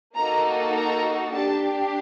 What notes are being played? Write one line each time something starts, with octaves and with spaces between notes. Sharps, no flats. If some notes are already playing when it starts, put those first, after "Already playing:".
A#3 D#4 F#4 A4 A#5
A#5
D4 G4 A5